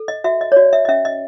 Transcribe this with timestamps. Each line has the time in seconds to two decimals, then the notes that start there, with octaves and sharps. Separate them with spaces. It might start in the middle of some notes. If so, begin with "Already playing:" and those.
Already playing: A4
0.08 D#5
0.24 F#4 E5
0.41 D#5
0.52 C#5
0.56 F#4 D5
0.73 E5
0.85 D#5
0.88 C#4 E5
1.05 D#5